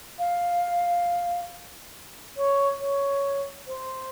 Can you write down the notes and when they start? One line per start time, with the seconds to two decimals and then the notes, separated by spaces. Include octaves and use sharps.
0.19 F5
2.37 C#5
2.80 C#5
3.67 C5